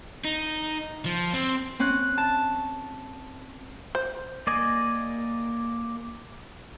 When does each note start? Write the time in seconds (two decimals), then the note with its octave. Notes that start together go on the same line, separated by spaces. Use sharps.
0.25 D#4
1.05 F3
1.34 C4
1.79 C4 C#4 F#6
2.18 A5
3.95 C5
4.47 A#3 D5 D#5 G#5